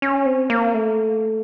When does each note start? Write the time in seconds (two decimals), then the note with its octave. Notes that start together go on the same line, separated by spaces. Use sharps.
0.02 C#4
0.26 C4
0.50 A#3
0.74 A3